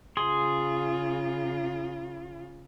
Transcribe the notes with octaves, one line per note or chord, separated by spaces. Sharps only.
C#3 F4 G#4 C6